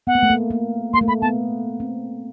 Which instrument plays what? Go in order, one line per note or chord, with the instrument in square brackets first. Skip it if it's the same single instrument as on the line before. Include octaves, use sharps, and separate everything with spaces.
[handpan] B3 [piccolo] F#5
[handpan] A#3
A3
A#3
A#3
[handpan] A#3 [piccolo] C6
[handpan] A3
[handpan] A#3 [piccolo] B5
[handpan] B3 [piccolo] A5
[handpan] C4